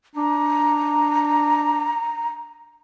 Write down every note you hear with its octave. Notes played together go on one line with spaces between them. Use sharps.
D4 A#5